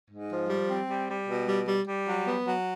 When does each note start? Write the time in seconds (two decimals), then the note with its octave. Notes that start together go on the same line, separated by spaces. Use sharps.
0.10 G#2
0.30 F3
0.50 G3
0.69 C4
0.89 G3
1.09 G3
1.29 B2
1.48 G3
1.68 G3
1.87 G3
2.08 F#3
2.27 B3
2.47 F#3